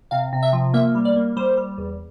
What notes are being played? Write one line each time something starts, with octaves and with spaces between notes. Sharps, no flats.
C3 F5
C3
E5
F3
A#3 E5
G3
D5
A#3
G3 C5
G3
E2